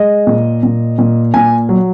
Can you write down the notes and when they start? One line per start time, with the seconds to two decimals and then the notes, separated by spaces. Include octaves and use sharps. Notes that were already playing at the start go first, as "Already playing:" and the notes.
Already playing: G#3 D#5
0.27 A#2
0.63 A#2
0.99 A#2
1.34 A#2 G#5
1.69 F#3